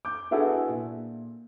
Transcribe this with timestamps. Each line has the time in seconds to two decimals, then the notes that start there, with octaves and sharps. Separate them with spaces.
0.05 D6 G6
0.31 B3 D4 E4 F#4 G#4 A4
0.69 A#2